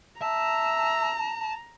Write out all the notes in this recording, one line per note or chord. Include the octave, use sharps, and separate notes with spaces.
E5 A5 A#5